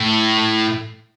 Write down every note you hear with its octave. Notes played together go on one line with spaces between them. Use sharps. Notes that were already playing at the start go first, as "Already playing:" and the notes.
Already playing: A2